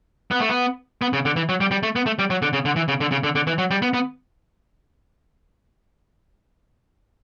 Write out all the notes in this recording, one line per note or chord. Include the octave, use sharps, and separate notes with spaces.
B3
A3
B3
B3
C#3
D3
E3
F#3
G3
G3
A3
B3
A3
G3
F#3
D3
C#3
D3
E3
C#3
D3
C#3
D3
D3
E3
F#3
G3
B3
B3